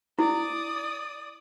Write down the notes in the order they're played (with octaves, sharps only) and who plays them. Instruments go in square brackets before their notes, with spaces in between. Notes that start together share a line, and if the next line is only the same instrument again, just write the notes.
[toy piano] E4 [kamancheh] D5 D#6